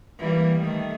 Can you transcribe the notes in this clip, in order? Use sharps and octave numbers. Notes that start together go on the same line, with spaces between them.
E3 G3 A#3
D#3 A3